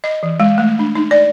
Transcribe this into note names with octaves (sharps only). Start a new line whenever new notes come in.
D#5
E3
G#3
A3
D4
D#4
D5